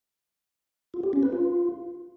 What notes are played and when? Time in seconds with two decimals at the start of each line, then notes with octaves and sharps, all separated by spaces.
0.94 F4
1.03 G4
1.13 C#4
1.23 B4
1.32 F4